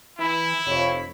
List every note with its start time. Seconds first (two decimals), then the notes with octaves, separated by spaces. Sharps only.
0.19 E3 E4 B5
0.66 F1 F2 C#5